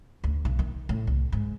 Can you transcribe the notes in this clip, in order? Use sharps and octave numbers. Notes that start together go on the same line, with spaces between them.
D2
B1
D#3
A2
C2
G#2